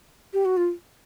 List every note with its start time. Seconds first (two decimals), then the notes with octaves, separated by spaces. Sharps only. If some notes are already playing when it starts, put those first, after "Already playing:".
0.33 G4
0.45 F#4
0.57 F4